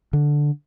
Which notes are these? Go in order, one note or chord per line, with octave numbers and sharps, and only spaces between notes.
D3